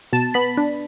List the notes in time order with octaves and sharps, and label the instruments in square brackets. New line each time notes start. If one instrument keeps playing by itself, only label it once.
[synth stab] B2 A5
B3 B5
D4